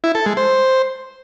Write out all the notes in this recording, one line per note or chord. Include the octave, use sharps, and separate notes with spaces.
E4
A4
G#3
C5